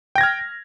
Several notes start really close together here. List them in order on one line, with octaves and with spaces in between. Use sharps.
G5 A#6 G#6 F6